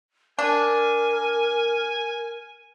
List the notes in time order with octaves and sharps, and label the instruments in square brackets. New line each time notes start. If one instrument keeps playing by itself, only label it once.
[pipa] D4 [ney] A#4 [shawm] G#5